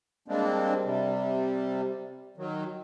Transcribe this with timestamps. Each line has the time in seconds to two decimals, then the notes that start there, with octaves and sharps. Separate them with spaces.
0.28 G3 G#3 A#3 C4 D4
0.85 C3 G3
2.37 D#3 F#3